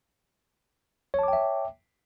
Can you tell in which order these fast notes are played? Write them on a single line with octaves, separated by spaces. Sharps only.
C#5 A5 D6 G5 E5